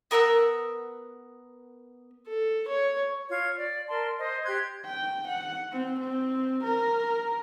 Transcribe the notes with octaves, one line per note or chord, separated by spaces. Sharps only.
B3 A#4 F#5 E6
A4
C#5
F4 C#5 G#6
D5
A#4 D5 A5 C6
C5 D#5
G4 C6 F#6 G#6
G5
F#5
C4
C4
A#4